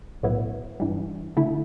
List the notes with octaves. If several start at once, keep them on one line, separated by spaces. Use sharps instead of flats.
B1 A2 F#3 B3 E4
G2 E3 G3
D3 A3 E4